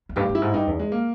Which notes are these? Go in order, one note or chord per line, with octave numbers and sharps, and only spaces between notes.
E2
G2 G4
G2
E4
G#2
G2 D#4
E2
G#3
A#3